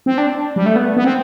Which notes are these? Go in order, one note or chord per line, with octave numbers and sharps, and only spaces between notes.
C4
D4
G3
A3
B3
B3
C4